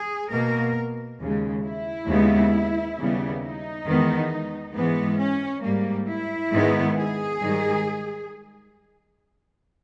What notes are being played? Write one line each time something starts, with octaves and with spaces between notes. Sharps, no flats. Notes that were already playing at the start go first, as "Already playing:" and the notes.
Already playing: G#4
B2 A#3 A#4
D#2 C#3 G#3
E4
D#2 C#3 G#3 B3
D#2 C#3 G3 B3
D#4
E2 D#3 G#3 B3
G#2 E3 G#3 B3
C#4
G#2 G3 A#3
E4
G#2 D#3 G#3 B3
G#4
G#2 D#3 G3